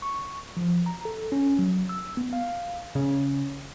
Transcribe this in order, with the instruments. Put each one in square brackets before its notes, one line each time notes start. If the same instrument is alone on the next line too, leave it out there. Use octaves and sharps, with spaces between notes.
[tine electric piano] C#6
F3
A#5
A4
C#4
F#3
E6
B3
F5
[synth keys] C#3